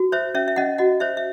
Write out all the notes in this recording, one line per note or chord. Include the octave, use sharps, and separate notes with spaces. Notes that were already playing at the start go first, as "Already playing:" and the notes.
Already playing: F#4
C5 C#5 E5
C#4 C#5 E5
E5
C#4 D#5 F#5
F#4 D#5 F#5
C5 C#5 E5
E5